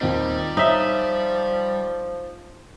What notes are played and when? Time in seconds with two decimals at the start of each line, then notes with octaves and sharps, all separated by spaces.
0.01 D#2 A#2 G3 C4 D#4
0.57 F3 D#4 C#5 E5